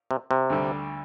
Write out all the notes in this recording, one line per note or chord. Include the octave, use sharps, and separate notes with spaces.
C3
C3
D2 D3 G3